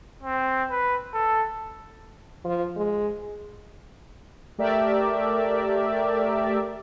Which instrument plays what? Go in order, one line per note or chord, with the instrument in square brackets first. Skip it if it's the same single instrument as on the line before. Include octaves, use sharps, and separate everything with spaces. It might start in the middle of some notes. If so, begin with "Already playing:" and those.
[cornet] C4
B4
A4
[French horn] F3
G#3
[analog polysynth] A3 G4 A#4 D5 E5